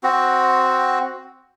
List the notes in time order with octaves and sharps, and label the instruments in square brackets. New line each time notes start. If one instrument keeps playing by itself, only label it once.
[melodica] C4 F#4